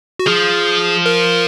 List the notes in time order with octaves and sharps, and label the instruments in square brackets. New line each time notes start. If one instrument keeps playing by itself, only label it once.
[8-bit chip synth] F#4
[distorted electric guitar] F3 [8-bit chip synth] G#4
[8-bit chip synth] A#4